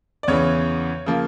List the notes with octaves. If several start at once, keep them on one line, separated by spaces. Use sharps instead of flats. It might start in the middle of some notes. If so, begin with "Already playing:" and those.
D5
E2 C#3 E3 C#5
C#3 F3 A#3